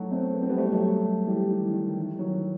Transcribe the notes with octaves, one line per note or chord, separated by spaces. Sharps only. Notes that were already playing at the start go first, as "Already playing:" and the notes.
Already playing: F#3 A3 D#4 E4 F#4
A3 C4
B3
C4
G3 B3
A3
G3
F#3 A3
E3 G3
D#3
E3
D#3
E3
D#3 F#3